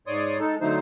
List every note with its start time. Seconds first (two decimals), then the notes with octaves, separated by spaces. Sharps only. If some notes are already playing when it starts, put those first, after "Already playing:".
0.07 G#2 C#5 D5 C6 D#6
0.39 G#3 D#4 A4
0.61 D3 F#3 A3 D#4 C5